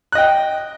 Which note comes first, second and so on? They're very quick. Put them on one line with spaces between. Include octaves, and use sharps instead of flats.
F#6 D#5 G5